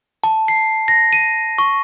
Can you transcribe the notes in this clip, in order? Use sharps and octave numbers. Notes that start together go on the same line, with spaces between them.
A5
C7
A#6
D#7
C#6